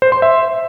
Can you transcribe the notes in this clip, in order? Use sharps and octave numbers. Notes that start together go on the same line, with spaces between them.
C5
C6
E5